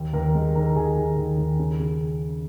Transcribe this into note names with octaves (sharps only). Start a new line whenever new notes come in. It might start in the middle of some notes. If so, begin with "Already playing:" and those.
Already playing: D#2
D#2 A#4 A#5
G#3
D#3 A#4 A#5
D#2 G#4 G#5
D#3
D#2
D#2
C#3
C#3